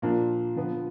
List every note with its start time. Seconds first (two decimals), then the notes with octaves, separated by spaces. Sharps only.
0.02 A#2 F3 A#3 D4
0.56 D3 F3 B3